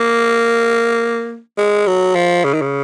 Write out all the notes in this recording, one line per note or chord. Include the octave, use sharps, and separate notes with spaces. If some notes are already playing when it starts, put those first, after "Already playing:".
Already playing: A#3
G#3
F#3
F3
C#3
D#3
C#3